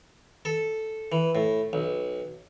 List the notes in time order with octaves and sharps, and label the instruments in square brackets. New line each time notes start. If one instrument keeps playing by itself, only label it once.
[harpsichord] A4
E3
A2
B1